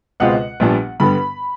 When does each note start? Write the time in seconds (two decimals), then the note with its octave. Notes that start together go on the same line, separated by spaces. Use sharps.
0.20 C#2 B2 G#3 C4 F4 F#5
0.60 A#1 A#2 G3 B3 D4
1.00 G2 D3 G3 B3 B5